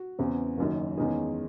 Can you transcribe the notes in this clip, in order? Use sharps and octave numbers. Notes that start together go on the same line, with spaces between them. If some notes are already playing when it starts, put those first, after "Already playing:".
Already playing: F#4
E2 C#3 E3 C4
F#1 F#2 D#3
E2 D#3 G#3 C#4 G#4